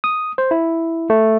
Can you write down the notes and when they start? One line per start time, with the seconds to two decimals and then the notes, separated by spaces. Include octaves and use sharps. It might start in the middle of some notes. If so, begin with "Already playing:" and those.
0.04 D#6
0.38 C5
0.51 E4
1.10 A3